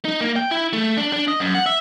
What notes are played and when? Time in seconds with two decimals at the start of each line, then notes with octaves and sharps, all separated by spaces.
0.05 D#4
0.21 A#3
0.36 G5
0.51 E4
0.73 A3
0.97 D4
1.13 D4
1.28 D#5
1.40 F#2
1.55 F#5
1.66 E5